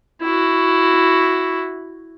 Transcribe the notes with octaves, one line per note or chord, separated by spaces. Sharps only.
E4 F#4